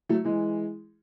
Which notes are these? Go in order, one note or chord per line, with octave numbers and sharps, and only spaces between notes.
F#3 A3
E3 G#3